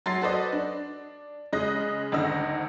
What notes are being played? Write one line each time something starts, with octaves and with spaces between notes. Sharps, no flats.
F#3 C6 A6 C7
F#4 A4 B4 C5 D5 D#5
D4
C#3 G#3 D#5 F#6 A#6
G#1 D2 D3 D#4 E6 A#6